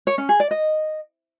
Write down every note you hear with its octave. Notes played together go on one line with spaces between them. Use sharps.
C#5
C#4
G#4
D5
D#5